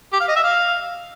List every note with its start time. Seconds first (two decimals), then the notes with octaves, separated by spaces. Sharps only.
0.13 G4
0.20 F5
0.28 D#5
0.36 E5
0.43 F5